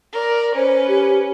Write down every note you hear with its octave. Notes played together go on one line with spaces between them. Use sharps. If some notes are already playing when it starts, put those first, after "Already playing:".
A#4 D5
C#4 B4 C5
G4